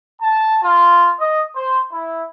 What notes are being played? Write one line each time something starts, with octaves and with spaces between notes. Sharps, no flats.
A5
F4
D#5
C5
E4